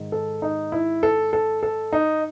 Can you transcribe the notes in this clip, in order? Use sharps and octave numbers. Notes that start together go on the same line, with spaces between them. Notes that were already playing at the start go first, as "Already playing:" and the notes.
Already playing: G#2 D#3
A4
D#4
E4
A4
A4
A4
D#4